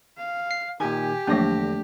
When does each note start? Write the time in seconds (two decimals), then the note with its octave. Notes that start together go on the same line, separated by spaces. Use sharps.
0.17 F5
0.51 C7
0.80 A#2 D#3 G4 G#5
1.27 E2 D3 F3 F#3 A3 A#3 D4 A#6